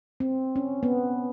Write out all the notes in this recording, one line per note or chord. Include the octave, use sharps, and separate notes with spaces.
C4
C#4
B3